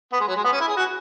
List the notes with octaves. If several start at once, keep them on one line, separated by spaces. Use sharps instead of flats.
B3
G#3
F#3
G#3
B3
C#4
E4
G#4
F#4